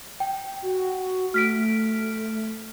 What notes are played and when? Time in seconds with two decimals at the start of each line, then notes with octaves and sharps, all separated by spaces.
0.20 G5
0.62 F#4
1.34 A3 F6 B6 D7